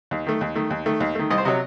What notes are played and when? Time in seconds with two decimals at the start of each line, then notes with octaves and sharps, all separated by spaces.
0.11 D#2
0.27 D#3 A3
0.41 D#2
0.55 D#3 A3
0.70 D#2
0.86 D#3 A3
1.00 D#2
1.15 D#3 A3
1.30 C2 D#5
1.38 C5
1.45 C3 F#3 D#5